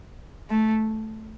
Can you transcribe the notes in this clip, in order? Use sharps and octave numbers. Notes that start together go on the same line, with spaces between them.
A3